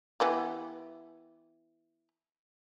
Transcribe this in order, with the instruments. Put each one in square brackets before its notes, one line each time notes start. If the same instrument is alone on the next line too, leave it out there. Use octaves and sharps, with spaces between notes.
[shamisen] E3 B3 G4